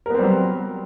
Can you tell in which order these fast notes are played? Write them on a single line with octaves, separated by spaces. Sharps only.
A#4 B3 C4 G3 F#3